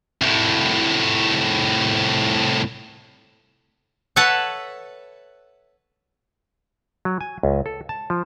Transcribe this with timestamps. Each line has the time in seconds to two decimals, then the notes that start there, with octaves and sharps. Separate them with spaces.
0.22 C2 A2
4.16 A4 B4 C#5 E5 F#5 A5
7.05 F#3
7.21 G#5
7.43 C#2
7.66 A4
7.89 A5
8.10 F3